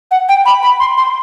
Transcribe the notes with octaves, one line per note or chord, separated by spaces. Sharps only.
F#5
G5
B5
B5
C6
C6